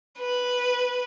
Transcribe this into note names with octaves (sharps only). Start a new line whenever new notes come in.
B4